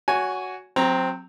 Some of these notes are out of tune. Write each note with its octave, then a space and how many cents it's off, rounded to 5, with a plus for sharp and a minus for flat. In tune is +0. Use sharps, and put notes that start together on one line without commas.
F#4 +0 C#5 +25 G#5 +0
F#3 -25 C4 +0 A#5 +0